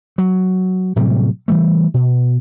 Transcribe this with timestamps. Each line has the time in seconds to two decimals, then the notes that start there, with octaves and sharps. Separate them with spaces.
0.18 F#3
0.96 A2 C3 F#3 G3
1.48 E3 G3 A3
1.94 B2